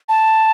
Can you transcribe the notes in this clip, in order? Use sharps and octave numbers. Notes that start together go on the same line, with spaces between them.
A5